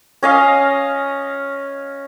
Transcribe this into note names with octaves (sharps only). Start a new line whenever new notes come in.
C#4 D#5 F5